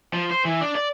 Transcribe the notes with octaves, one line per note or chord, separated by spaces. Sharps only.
F3
C5
E3
D4
D5